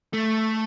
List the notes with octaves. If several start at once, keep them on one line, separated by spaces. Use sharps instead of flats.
A3